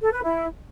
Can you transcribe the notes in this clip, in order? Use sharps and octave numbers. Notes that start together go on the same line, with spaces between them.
A4
B4
E4